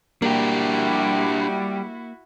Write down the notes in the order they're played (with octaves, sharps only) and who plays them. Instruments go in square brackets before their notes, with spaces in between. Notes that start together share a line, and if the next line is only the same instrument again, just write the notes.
[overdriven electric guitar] G3 G4 [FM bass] A#3 [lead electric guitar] D4 A#4 [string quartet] E4 F#4